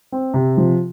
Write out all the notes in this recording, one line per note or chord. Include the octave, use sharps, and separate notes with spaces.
C4
C3
F3